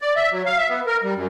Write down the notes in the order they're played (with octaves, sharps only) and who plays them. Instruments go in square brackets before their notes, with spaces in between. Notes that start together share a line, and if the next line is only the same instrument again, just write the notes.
[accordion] D5
E5
F#3
F5
E5
B3
A#4
G3
F#2